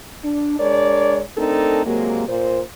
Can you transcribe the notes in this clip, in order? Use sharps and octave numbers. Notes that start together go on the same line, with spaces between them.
D4
G#3 D4 A#4 C#5 D5
A3 C4 D4 D#4 A4 A#4
C3 F#3 G#3 A#3
A#2 C5